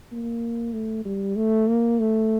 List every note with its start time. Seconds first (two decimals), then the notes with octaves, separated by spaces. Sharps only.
0.12 A#3
0.73 A3
1.05 G3
1.36 A3
1.67 A#3
1.99 A3